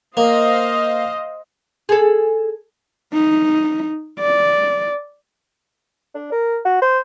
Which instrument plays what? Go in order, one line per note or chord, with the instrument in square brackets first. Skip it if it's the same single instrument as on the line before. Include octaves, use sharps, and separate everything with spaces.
[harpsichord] A#3 [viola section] C5 D#5 F5
[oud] G#4 A4
[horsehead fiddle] D#4
D5
[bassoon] D4
A#4
F#4
C5